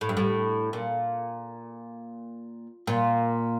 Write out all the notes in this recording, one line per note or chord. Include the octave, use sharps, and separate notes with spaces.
A2
G2
A2
A#2
A#2